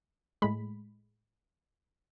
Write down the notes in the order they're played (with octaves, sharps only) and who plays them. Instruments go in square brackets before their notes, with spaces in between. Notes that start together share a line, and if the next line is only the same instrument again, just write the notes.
[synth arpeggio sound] A2 G#3 B5